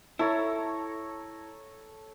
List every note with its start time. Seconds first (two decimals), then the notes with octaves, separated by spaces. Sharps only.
0.19 E4 A4 C#5 A#5